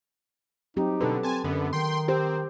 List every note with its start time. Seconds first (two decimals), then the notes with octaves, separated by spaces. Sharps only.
0.76 F#3 C4 D#4 G4
1.01 B2 D3 A4 B4
1.23 C4 G#5 A5
1.44 F#2 D3 B3
1.73 D#3 G5 C6
2.08 C4 G4 C5